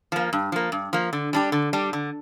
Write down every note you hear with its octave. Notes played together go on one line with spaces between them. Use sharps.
F3 A#3
G2
F3 A#3
G2
F3 A#3
D3
G3 D4 G4
D3
G3 D4 G4
D3